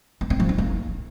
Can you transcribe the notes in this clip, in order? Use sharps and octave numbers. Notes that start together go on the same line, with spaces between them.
B3
C4
F3
C#4
A#3